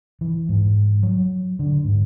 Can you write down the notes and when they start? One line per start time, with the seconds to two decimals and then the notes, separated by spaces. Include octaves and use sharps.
0.21 E3
0.49 G#2
1.03 F#3
1.59 D3
1.85 G#2